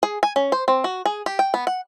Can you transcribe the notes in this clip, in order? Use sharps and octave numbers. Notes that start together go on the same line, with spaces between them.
G#4
G#5
C#4
C5
C4
F#4
G#4
G4
G5
B3
F#5